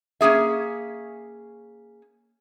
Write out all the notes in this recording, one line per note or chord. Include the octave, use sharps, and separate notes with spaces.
A#3 C#4 G#4 E5